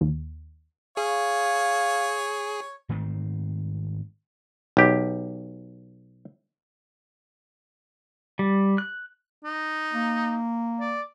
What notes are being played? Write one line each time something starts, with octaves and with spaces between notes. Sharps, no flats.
D#2
G#4 C#5 F5
G#2 D#3 A3 C4
B1 G4
G3
F#6
D#4
A#3
D5